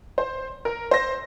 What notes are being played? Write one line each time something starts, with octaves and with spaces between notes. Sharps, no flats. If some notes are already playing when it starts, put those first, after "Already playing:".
C5
A#4
C5 A#6